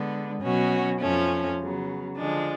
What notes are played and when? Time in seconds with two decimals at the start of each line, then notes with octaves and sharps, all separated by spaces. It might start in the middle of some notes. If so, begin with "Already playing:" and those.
Already playing: D3 G#3 B3 D4
0.42 B2 F#3 C#4 F#4
1.00 F2 F3 A3 C#4
1.59 C#3 F#3 B3
2.18 D3 F3 G#3 D4